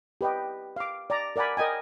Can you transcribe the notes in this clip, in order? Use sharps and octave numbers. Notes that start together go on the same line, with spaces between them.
G4 B4 D#5 G5
F5 D6
D5 A#5
A#4 D5 F#5 G#5 B5
A#4 D#5 G5 G#5